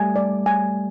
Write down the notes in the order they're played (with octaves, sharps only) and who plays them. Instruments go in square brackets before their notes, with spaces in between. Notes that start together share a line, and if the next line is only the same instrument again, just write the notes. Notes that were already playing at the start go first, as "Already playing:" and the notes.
Already playing: [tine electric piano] G3 A3 [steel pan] G#5
[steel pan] D5
G#5